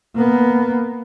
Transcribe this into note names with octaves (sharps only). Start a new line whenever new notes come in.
A#3 B3